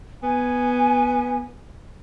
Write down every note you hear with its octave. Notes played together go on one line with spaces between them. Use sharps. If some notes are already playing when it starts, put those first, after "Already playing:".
B3 G#5